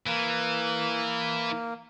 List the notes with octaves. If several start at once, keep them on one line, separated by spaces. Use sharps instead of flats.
E3 A#3